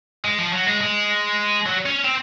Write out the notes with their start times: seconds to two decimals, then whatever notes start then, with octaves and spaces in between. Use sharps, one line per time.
0.24 G#3
0.38 F3
0.53 F#3
0.67 G#3
0.81 G#3
1.66 F#3
1.86 C#4
2.04 C4